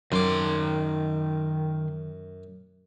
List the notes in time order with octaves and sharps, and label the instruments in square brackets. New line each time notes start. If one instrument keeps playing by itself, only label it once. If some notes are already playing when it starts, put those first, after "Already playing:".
[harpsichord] F#2 D6 [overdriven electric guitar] D#3 C6